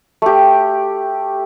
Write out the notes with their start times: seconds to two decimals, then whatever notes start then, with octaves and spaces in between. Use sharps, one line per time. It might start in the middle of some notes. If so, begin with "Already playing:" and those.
0.22 A3 G4